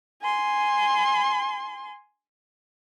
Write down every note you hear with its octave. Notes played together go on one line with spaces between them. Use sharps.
G#5 C6